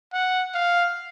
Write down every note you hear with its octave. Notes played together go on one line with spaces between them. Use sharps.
F#5
F5